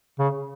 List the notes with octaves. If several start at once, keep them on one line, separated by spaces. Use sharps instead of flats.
C#3